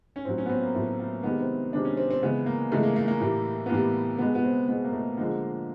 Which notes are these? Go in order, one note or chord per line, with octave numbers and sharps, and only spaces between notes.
C#4
A2 F#3 C4
C#4
B3
C4
A#3
A2 F#3 A3
A#3
C3 D#3 G#3 B3
C4
C3 D#3 G#3 D4
C#4
C4
C4
C#3 E3 G#3 B3
A#3
C#3 E3 G#3 A3
A#3
A#3
A#3
A2 E3 G3
B3
A2 E3 G3 A#3
B2 G#3 B3
B3
C4
B2 G#3 B3
A#3
A3
D3 F3 G#3 A#3